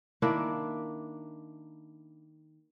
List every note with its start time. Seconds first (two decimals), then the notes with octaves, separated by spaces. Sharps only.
0.22 D#3 A#3 D4 E4